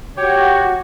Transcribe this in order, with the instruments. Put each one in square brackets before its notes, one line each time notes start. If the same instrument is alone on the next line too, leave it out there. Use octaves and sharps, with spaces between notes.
[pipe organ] F#4 [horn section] G4 C#5